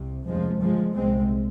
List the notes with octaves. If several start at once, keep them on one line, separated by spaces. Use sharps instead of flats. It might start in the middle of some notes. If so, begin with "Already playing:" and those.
Already playing: C2 C3
F1 D#2 C#3 F3 G#3
G1 G2 F3 G#3
C2 A#2 G#3 C4